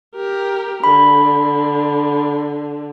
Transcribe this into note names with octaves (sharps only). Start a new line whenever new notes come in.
G4 A#4
D3 B5